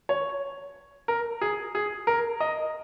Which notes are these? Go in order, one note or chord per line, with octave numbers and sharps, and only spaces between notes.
C#5
A#4
G#4
G#4
A#4
D#5